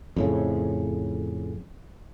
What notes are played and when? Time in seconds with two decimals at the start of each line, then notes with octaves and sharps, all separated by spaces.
0.16 F2 A2 C#3